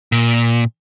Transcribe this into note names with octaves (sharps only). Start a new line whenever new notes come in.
A#2